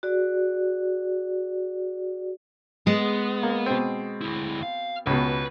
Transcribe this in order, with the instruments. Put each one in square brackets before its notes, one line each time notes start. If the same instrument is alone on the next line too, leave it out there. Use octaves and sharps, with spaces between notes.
[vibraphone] F#4 G#4 D5
[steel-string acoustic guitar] G#3 [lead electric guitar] B3
[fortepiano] A#3
B2 C4
[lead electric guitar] D2 E4
F5
[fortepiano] C#2 B2 [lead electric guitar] B4